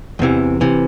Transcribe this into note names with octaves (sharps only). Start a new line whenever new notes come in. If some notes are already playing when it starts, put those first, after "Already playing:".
E2 C3 E3
C3 E3